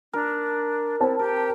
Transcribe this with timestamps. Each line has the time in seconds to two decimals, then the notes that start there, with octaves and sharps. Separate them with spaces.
0.13 D4 A#4
1.01 C4 E4 A5
1.19 G4 A#4